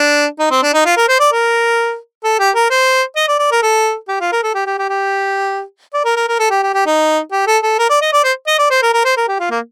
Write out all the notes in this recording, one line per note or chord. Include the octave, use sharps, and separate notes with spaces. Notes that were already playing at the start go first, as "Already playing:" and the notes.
Already playing: D4
D#4
C4
D4
D#4
F4
A#4
C5
D5
A#4
A4
G4
A#4
C5
D#5
D5
D5
A#4
A4
G4
F4
A#4
A4
G4
G4
G4
G4
D5
A#4
A#4
A#4
A4
G4
G4
G4
D#4
G4
A4
A4
A#4
D5
D#5
D5
C5
D#5
D5
C5
A#4
A#4
C5
A#4
G4
F4
A#3